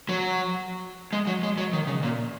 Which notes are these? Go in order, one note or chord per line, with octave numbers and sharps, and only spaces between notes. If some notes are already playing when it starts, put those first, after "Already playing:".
F#3
G#3
F#3
G#3
F#3
D#3
C#3
A#2